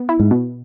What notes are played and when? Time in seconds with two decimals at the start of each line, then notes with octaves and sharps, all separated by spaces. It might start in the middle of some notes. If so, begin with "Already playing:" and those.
Already playing: B3
0.09 E4
0.20 G#2
0.31 B2